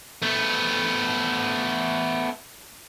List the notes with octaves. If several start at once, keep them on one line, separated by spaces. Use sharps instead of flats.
A3 B3